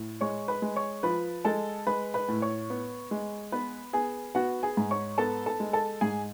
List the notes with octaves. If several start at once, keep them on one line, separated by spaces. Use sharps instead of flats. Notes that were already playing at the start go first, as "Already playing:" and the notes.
Already playing: A2
G#3 C#5 C#6
B4 B5
G#3
C#5 C#6
F3 B4 B5
G#3 A4 A5
G#3 B4 B5
B4 B5
A2
C#5 C#6
B3
G#3
B3 B4 B5
B3 G#4 G#5
B3 F#4 F#5
G#4 G#5
G#2
C#5 C#6
B3 A4 A5
A4 A5
G#3
A4 A5
G#2 G#4 G#5